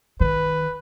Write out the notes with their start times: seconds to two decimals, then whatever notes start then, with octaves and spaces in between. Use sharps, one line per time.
0.20 D#3 B4